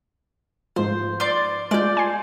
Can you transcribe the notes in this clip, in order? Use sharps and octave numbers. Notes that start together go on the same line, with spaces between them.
G#2 F3 C5
D5 C6
G#3 F4 D5 G6
G#5 C6